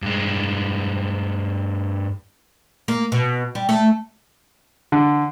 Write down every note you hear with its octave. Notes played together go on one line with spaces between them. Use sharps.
G2 G#3
A#3
B2
G3
A3
D3